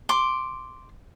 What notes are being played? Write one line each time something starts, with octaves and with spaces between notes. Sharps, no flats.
C6 D6